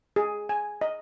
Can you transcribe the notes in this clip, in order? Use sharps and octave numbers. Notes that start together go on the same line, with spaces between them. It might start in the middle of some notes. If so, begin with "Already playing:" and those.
G#4
G#5
D#5